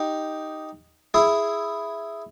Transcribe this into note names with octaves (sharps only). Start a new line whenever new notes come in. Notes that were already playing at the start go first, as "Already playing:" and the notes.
Already playing: D#4 G4
E4 G#4